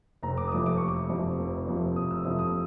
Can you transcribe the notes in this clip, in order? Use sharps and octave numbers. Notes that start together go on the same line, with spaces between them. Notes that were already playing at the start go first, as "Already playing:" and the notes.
F1 A#5
D6
D#6
F2 C3 F3 A3 D6
D6
F1 C#6
D6
F2 C3 F3 A3
F1
F2 C3 F3 A3
F1 D#6
E6
F2 C3 F3 A3 D#6
D#6